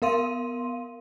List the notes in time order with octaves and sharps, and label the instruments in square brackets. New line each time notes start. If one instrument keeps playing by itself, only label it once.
[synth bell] B3 A#4 F5 C6 D#7